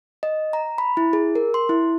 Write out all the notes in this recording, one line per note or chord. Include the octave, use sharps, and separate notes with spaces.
D#5
A#5
B5
E4
G#4
A#4
C6
E4